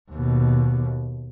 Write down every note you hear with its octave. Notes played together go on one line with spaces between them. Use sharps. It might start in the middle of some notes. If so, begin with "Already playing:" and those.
D#2 B2